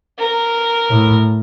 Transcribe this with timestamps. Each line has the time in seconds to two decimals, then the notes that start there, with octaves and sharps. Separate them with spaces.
0.19 A#4
0.90 A2